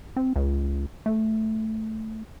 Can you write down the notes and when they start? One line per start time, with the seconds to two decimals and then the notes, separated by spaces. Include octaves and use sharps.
0.16 C4
0.36 C#2
1.06 A3